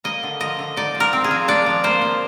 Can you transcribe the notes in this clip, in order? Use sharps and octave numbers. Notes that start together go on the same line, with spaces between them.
A#3 D#5
D3
F3 D#5
D3
D#4 D5
F3
A#4
C4
G#4
F3
D4 D5
F3
A#3 C5
F3